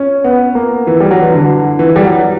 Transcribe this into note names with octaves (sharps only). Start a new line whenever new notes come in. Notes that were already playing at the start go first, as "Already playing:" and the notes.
Already playing: C#4
B3
A#3
E3
G3
F#3
E3
D3
E3
G3
F#3